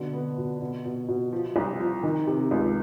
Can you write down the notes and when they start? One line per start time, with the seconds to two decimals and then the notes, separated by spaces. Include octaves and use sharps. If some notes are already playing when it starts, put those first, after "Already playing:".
Already playing: B2 D3
0.13 B3
0.38 B2
0.61 B2
0.85 B2
1.08 B2
1.33 F3
1.56 C2
1.80 F3
2.03 D#3
2.27 C3
2.51 C#2